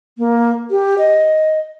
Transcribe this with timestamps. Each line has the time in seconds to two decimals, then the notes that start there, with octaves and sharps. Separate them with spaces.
0.18 A#3
0.71 G4
0.98 D#5